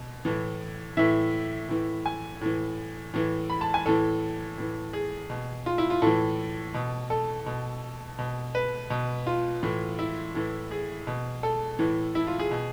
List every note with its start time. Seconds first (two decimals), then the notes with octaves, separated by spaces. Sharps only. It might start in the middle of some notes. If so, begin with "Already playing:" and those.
Already playing: B2
0.25 A2 E3
0.97 A2 E3 E5
1.69 A2 E3
2.06 G#5
2.41 A2 E3
3.14 A2 E3
3.50 B5
3.61 A5
3.74 G#5
3.86 A2 E3 A4
4.58 A2 E3
4.93 G#4
5.30 B2
5.66 F4
5.78 E4
5.90 F4
6.02 A2 E3 A4
6.74 B2
7.10 A4
7.46 B2
8.19 B2
8.55 B4
8.90 B2
9.27 F4
9.63 A2 E3
9.99 E4
10.35 A2 E3
10.71 G#4
11.07 B2
11.43 A4
11.79 A2 E3
12.15 E4
12.27 F4
12.39 G#4
12.51 B2